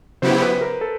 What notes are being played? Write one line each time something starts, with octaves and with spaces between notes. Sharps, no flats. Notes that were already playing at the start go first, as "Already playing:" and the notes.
C#3 F#3 B3 E4 G4 C5
B4
A#4
A4